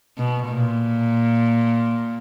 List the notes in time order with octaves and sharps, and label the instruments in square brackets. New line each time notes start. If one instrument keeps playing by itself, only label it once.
[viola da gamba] B2
A#2